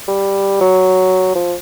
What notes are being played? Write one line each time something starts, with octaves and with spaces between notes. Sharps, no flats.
G3
F#3
F3